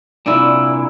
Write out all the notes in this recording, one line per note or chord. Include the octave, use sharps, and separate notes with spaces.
C2 A#2 D4 E4